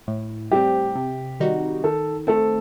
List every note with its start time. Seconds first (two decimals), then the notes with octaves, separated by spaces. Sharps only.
0.08 A2
0.51 G3 C4 G4
0.96 C3
1.40 D#3 G3 D#4 F#4
1.84 D#3 A4
2.27 A3 C4 A4